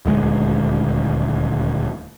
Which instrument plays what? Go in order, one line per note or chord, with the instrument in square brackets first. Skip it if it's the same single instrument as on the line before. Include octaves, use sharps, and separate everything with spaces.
[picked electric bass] D#1 D2 G#3